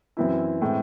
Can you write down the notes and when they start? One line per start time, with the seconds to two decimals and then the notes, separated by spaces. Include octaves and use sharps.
0.17 F#2 E3 C4 E4
0.62 A2 E3 G#3 C4